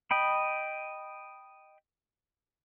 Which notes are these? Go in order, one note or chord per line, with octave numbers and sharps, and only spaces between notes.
D#5 G5 B5